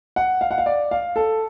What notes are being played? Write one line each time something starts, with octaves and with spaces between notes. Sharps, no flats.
F#5
F5
F#5
F5
D5
F5
A4